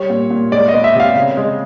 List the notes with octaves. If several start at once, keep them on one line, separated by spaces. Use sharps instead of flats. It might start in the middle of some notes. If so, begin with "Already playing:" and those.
Already playing: G3 C#5
A#2
A#2
G#3 D5
B3 D#5
E5
C3
F5
C#3
G#3